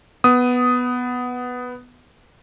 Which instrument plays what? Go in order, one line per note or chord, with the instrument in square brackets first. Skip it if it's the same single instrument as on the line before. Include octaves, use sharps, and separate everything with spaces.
[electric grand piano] B3 D#6